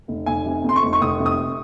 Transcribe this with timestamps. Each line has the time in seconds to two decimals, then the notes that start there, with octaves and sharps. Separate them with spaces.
0.08 F1
0.26 F1 G#5
0.46 C3
0.64 F2 C6
0.76 C#6
0.83 F1
0.93 C#6
1.01 F1 D#6
1.20 C3
1.26 D#6